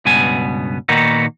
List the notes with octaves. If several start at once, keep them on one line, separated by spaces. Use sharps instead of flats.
C#2 G2 B2 B3 G#5
A#2 D#3 A#3 B3 D#4 F#4